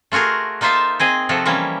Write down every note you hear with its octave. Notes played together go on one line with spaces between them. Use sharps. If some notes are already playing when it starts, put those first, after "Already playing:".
A3 F4 F#4 G#4 A#4
A#3 D#4 F4 C5 E5 A5
C4 G#4 D#5 G#5
C3 F3 F#4 A4
E3 F3 G3 A#3 C#4